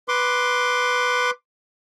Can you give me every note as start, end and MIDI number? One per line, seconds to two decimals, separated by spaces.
0.08 1.31 71
0.08 1.31 84
0.08 1.31 86